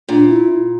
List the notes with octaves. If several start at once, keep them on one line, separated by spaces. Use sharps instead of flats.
A#2 D4
E4